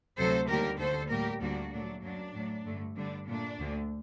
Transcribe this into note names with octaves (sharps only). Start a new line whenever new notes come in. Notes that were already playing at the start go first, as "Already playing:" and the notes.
D2 C3 F#3 A3 A4 C5
D#2 D3 G3 A#3 G4 A#4
D2 D3 A3 A4 C5
A2 G3 A#3 G4 A#4
D2 D3 G3 A#3 D4 F#4
A#2 F#3 A3 D4
F#2 F#3 A#3 D4
A2 F#3 A3
G2 D3 A3
G2 D3 G3 D4
A#2 A3 D4
D2 D3 A3